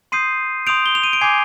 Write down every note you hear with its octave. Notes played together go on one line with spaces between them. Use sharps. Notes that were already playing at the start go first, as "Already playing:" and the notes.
C6 D#6 G6 C7 D#7
C6 D#6 G6 D7 F7
G7
F7
D#7
D7
G#5 D6 G6 G#6 C7